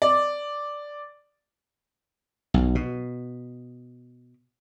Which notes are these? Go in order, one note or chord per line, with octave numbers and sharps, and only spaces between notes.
D5
B1
B2